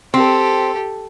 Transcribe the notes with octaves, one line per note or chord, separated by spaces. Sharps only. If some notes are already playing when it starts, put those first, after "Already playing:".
C4 G4 A4